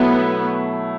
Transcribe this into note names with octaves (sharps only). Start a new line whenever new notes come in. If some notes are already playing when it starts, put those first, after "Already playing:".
Already playing: B2 F#3 A3 B3 E4